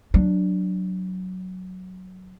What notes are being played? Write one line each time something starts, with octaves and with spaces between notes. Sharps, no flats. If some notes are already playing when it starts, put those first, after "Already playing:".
F#3 D4